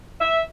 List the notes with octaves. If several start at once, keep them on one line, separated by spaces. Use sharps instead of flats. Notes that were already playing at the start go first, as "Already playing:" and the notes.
E5